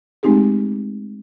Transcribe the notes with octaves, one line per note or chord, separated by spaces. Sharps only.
G#3 A3 C4 D#4 G4 G#4